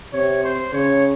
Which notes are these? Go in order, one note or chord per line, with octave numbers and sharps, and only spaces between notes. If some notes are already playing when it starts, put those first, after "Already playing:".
C3 C#5
C5
C#3 C#5